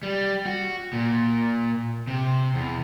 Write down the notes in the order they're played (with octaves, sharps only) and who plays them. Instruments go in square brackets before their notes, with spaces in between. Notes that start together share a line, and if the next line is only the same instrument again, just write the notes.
[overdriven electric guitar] G3
F#4
A#2
C3
E2